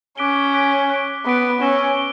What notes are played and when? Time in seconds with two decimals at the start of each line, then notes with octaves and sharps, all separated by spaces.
0.17 C#4 D6 F#6 B6 D7 G7
0.54 D6 F#6 B6 D7 G7
0.90 F#6 B6 D7
1.25 B3 F#6 B6 D7
1.61 C#4 E6 A#6 E7 G7
1.97 E7 G7